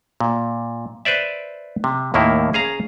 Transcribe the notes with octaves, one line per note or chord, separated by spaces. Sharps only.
A#2
B4 C5 D5 E5
C3
D#2 A2 D#3 A#3 E4
C#4 G#4 F5 A#5